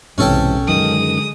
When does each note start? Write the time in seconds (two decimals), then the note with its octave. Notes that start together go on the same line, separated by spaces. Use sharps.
0.18 B1 E2 G#2 C3 E3 C#4 A4 G5
0.68 F#2 D3 D#3 G#3 D#6